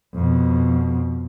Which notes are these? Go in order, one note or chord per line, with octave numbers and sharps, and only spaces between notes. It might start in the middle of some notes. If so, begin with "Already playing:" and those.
F2 B2